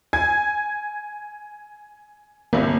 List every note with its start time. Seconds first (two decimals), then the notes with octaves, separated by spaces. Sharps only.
0.13 G#5 G#6
2.53 G1 C2 A#3